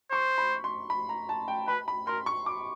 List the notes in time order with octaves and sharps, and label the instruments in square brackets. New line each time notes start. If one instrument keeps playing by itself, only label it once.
[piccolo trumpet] C5 [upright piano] C#6
[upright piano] B5
C6
B5
A#5
A5
G5
[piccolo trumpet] B4 [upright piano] B5
[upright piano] B5
[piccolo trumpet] A#4 [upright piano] C6
[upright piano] C#6
D6